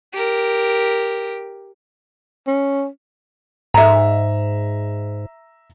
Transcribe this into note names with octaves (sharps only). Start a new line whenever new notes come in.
G4 A#4
C#4
G#2 E5 A#5